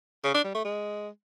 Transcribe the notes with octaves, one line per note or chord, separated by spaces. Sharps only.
C#3
D4
G3
A3
G#3